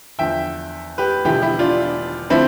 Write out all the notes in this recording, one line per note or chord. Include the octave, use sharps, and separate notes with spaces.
E2 D3 F3 E5 G5
G4 B4
E1 E2 D3 F3 E4 G4
E4 G4
D4 F4
D3 F3 C4 E4